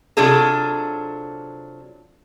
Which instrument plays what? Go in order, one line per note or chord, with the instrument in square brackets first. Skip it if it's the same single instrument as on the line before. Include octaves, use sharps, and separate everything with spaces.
[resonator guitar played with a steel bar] C3 F#3 D4 F4 G#4 A4